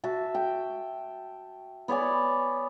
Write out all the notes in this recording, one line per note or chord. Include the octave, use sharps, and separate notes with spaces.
F#4 E5 A5
G5
B3 C#5 D5 G#5